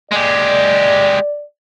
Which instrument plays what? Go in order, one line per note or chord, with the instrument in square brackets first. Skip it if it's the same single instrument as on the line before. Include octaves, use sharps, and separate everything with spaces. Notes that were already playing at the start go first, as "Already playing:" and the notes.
[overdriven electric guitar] G#3 G4 [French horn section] D5